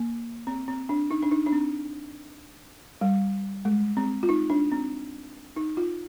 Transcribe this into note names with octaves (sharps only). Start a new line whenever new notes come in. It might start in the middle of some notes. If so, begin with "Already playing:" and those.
Already playing: A#3
C4
C4
D4
D#4
D4
D#4
D4
C4
G3
G#3
C4
F4
D#4
D4
C4
D#4
F4